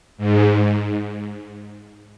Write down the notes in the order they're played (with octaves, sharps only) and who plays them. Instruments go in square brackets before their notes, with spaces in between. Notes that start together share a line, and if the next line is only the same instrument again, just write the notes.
[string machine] G#2